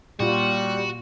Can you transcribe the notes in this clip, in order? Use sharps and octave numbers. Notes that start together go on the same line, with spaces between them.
A#2 G3 F4 F#4